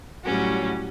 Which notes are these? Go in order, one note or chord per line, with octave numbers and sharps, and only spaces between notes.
A2 F#3 G3 C#4 F#4